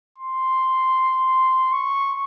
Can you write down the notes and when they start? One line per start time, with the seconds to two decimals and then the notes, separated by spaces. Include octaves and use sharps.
0.18 C6
1.72 C#6